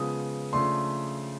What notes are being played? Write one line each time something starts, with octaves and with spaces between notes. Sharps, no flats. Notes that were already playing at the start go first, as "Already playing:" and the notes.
Already playing: C#3 F3 G#3 B3 D#6
C#3 F3 A3 D4 C6